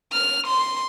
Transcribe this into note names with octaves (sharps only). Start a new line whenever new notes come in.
F6
C6